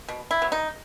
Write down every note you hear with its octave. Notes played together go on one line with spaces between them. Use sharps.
B2
E4
F#3 B3
D#4